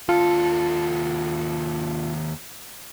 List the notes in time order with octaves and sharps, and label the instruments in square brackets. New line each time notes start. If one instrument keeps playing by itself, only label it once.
[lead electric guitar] D#2 A4 [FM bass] F4